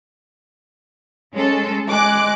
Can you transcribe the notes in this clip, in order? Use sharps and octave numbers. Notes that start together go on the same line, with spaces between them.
G#3 C#4 A4
G#3 D6 F#6